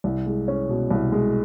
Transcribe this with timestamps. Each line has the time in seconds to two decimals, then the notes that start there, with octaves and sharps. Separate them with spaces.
0.04 C2
0.26 G#3
0.48 C#4
0.69 B2
0.91 C2
1.12 G#3